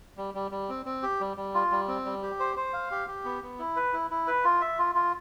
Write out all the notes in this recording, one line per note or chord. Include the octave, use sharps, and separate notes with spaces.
G3
G3
G3
C4
C4
G4
G3
G3
F4
G3
C4
G3
G4
C5
C5
F5
G4
G4
B3
B3
E4
B4
E4
E4
B4
F4
E5
F4
F4